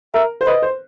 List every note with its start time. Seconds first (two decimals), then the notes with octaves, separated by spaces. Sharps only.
0.14 A#4 E5
0.41 C5
0.47 B4 D#5
0.62 C5